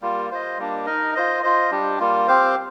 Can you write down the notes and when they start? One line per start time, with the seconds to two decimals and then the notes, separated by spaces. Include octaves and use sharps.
0.02 G3 A#3 F4
0.30 F4 C5 D#5
0.58 G3 A#3 D4
0.86 D#4 A#4 D#5
1.15 F4 C5 D#5
1.42 F4 C5 D#5
1.71 G3 D4 G4
1.99 G3 A#3 F4
2.28 C4 G4 C5 F5